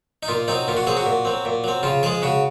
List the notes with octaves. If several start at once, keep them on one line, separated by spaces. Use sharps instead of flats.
D#4
A#2 F4
F#3 C4 D#4
A#2 F4
F#4
F#3 C4 G#4
F#4
A#2
F#3 C4
A#2
F#3 C4
C#3 F4
F3 G#3 G#4
C#3 F#4